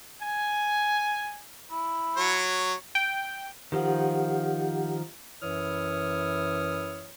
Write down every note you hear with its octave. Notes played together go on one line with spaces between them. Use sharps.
G#5
E4
F#3 C#5
G5
D#3 F3 G4 F#5
F#2 E3 E4 C#5 D#6 F6